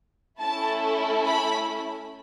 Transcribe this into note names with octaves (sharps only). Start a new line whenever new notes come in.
A3 C#4 E4 A4 A5
B5